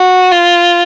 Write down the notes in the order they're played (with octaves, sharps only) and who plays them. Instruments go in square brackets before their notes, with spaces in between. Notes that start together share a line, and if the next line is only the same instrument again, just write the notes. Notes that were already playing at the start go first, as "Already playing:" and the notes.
Already playing: [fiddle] F#4
F4